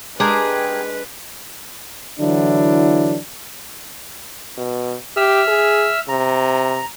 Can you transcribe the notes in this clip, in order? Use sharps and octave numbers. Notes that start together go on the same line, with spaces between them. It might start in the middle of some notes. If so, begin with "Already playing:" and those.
G#3 D4 G4 G#4 A#4 B4
D3 E3 F#3 D4 E4
B2
G4 E5 E6 F6
G#4
C3 A#5